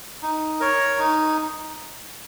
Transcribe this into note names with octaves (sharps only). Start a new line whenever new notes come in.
D#4
A#4 C#5
D#4